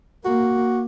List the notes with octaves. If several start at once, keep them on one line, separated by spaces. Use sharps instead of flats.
A#3 F#4